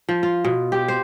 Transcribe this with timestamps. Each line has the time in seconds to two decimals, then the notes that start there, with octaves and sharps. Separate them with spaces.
0.09 F3
0.23 F4
0.44 B2
0.72 G4
0.88 C5